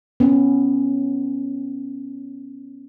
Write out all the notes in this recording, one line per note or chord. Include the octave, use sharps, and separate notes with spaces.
B3 C#4